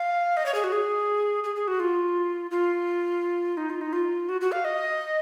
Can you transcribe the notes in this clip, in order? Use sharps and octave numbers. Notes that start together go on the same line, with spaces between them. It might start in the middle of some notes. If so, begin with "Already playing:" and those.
Already playing: F5
D#5
C#5
G#4
F#4
G#4
G#4
G#4
F#4
F4
F4
D#4
F4
D#4
F4
F#4
F#4
F5
D#5